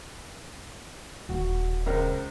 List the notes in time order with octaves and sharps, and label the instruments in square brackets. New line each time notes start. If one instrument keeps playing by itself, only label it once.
[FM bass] D#1 [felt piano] F#4
[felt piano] C#2 A#4 C5